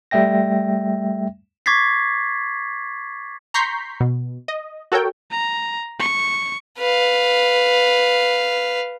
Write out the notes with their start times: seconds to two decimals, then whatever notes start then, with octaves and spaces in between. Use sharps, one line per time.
0.11 G3 A3 E5 G5 A#6
1.66 C#6 D6 G#6 A6 B6 C7
3.54 A#5 C6 C#6 G6 B6 C7
4.00 B2
4.48 D#5
4.92 F#4 A4 A#4 C#5 G5
5.31 A#5
6.00 C#6
6.78 B4 F5